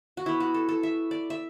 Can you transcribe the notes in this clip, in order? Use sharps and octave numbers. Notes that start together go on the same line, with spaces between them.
F#4
E3 B3 E4
F#4
A4
A4
E5
D5
E5